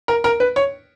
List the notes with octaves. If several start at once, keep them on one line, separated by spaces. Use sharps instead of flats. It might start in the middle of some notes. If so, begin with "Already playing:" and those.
A#4
A#4
B4
C#5